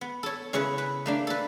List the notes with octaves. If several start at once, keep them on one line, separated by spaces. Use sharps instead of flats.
B3
A4 C#5
C#3 C#4 E4 B4 C#5
B4
A3 A#3 D4
A4 B4